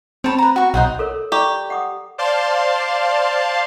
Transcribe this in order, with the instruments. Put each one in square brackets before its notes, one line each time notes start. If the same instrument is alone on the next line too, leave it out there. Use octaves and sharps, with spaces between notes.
[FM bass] C4 [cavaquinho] C#5 A5 B5
[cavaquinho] B4 A#5
F#4 C#6
[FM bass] B1 [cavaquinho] D#4 C5 F#5
[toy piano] A4 A#4 C#5
[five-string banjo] G4 [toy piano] D5 A#5 C#6
[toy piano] F#5 D6 D#6
[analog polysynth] C5 D5 F5 A5 C6